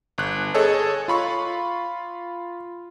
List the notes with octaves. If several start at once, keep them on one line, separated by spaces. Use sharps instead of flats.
G1 F#6
G#4 A4 C#5 D#5
F4 B5 C#6